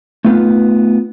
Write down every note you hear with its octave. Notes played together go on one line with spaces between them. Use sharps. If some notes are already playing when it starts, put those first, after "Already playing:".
A3 B3 D#4 F4 B4